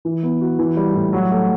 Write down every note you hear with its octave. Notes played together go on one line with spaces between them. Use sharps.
E3
B3
F#4
E3
G3
A2
F#3
A3